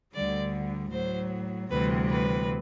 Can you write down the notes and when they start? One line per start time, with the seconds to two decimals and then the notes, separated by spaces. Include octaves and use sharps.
0.14 D2 D3 G3 D5
0.92 A2 F#3 C5
1.70 D2 C3 E3 G3 B4
2.09 B4